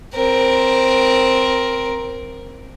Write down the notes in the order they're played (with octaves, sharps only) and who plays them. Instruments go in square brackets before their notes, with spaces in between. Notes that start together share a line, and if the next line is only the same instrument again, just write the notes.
[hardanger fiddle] C4 A#4